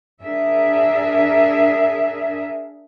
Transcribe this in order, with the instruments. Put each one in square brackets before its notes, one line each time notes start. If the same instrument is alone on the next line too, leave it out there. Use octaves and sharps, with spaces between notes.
[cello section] D4 G#4 A#4 E5